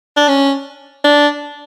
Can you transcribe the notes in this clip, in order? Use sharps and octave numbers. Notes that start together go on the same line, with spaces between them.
D4
C#4
D4